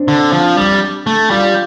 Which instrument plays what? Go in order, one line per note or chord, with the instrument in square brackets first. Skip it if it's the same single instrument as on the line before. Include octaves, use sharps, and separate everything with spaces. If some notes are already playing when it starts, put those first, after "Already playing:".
Already playing: [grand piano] C4 D4
[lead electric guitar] D3
F3
G3
A3
[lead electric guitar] G3 [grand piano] F4